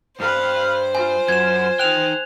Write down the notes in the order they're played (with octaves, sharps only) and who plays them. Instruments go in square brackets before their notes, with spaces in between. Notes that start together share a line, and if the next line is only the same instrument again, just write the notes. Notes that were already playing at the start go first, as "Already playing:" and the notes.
[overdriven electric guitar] G2 [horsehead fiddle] B4 F5 [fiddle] C5
[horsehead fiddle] F4 [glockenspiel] G#5
[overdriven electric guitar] F#2 [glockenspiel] G#6 E7
[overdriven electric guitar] D#4 G5 [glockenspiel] F#6 F7